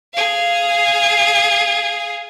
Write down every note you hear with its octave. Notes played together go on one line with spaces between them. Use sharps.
G#4 F5